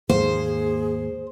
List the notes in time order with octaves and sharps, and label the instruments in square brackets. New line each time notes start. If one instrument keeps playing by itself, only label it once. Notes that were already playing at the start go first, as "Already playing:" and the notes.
[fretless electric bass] D#2 G#2 [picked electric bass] A#3 [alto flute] G#4 [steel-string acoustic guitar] C5